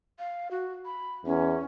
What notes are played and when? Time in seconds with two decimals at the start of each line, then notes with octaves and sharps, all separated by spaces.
0.19 F5
0.51 F#4
0.85 B5
1.26 E2 C#4